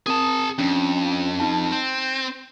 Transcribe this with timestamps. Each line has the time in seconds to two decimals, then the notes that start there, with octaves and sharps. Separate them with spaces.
0.06 C4 G#4 A#4 A5 D#6
0.59 F2 C#4 D4
1.40 D#4 A5
1.72 C4 G6